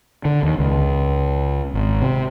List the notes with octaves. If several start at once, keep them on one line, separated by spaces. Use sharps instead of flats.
D3
D#2
C#2
G#1
C3